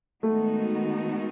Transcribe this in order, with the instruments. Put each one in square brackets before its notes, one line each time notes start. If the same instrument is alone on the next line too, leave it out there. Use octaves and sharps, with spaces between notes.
[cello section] D#3 G#3 B3 D#4 F#4 [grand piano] A3